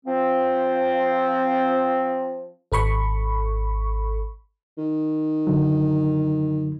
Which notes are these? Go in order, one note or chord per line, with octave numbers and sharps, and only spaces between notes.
F3 C4
G#1 A4 B5 C#6
D#3
F#2 D3 F#3